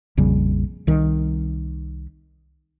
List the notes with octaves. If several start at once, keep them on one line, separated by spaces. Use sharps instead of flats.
A#1 F2 C#3 G3
C2 D#3